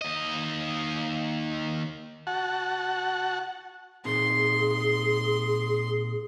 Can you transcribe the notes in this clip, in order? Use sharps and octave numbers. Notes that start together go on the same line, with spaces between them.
D#2 D#5
F#4 F#5 A5
A#2 C4 D#4 G#4 C6